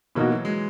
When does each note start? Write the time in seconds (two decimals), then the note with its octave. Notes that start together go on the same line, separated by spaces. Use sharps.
0.15 B2 E3 A#3 D#4 F#4
0.31 F#3
0.45 G#3